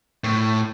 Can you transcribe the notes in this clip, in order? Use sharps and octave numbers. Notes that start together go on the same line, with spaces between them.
A2